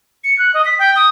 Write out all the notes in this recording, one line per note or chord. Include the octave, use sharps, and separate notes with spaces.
C#7
F#6
D#5
B6
G5
D#6